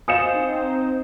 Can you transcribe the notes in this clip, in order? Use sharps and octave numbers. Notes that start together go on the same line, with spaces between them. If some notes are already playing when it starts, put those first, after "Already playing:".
C5 D#5 F5 G#5 D#6 C#7 E7
C4 D#4